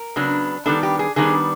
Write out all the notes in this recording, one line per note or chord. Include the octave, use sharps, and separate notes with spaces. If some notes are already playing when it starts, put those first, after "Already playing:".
Already playing: A#4
C#3 F#3 B3 D4
D#3 G3 B3 D4 A4
G4
G#4
D#3 G3 B3 D4 G#4